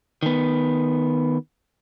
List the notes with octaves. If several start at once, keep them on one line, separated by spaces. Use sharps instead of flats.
D#3 B3